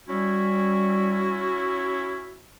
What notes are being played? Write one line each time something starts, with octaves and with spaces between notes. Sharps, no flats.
G3 C#4 E4 F#4